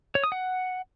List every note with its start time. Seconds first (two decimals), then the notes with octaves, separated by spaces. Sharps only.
0.15 C#5
0.24 D#6
0.32 F#5